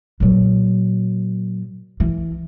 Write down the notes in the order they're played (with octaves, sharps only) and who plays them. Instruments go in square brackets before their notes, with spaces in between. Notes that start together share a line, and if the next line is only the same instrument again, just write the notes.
[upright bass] A#2 F#3
E3